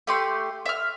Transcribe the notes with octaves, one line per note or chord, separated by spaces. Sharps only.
A3 G4 C6
E5 F6